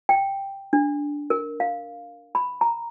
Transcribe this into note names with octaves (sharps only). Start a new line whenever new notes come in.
G5
D4
A#4
F5
B5
A#5